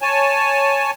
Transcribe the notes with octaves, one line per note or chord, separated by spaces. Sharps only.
C#5 G#5 A5